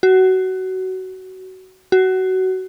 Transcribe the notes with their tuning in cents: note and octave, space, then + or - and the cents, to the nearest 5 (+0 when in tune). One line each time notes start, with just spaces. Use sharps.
F#4 +20
F#4 +20